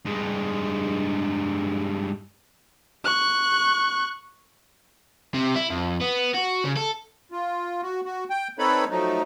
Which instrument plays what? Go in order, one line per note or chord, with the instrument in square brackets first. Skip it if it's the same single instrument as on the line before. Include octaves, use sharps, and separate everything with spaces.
[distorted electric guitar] G2 G#3
[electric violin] C#6 F#6
[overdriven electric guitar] C3
E4
F2
B3
F#4
C#3
A4
[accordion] F4
F#4
F#4
G5
C4 D#4 A4 B4 C#5 B5
F3 F#3 A3 D#4